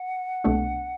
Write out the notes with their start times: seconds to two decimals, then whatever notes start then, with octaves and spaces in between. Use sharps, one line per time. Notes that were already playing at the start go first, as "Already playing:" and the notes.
Already playing: F#5
0.44 C2 B2 A3 D4